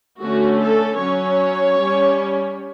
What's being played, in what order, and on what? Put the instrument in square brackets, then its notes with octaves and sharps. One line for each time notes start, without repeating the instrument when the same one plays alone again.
[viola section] D3 A3 C#4 F#4
A4
F#3 C#4 C#5
G3 C#4